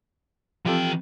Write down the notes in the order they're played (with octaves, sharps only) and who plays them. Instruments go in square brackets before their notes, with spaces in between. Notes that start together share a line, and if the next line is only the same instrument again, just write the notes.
[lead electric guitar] E3 G5 [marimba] F3 C4 [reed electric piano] F4 G4 A4